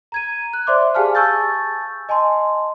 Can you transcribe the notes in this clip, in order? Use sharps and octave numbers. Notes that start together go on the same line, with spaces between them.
A#5 G#6 D#7
F#6
C5 D5 E5 C6 D6
G4 G#4 F5 G#5 A5 F6
G#5 A5 C#6 E6 G6 A6
D#5 G#5 A5 C6